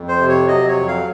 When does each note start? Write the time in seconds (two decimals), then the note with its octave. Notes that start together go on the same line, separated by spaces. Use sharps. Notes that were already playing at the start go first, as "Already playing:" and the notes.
Already playing: F2
0.08 C5
0.19 C3
0.29 C#5
0.48 F#3 D#5
0.68 C#5
0.77 F2
0.88 F5